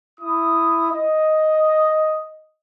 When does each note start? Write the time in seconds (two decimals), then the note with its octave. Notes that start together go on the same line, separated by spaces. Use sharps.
0.20 E4 D#6
0.91 D#5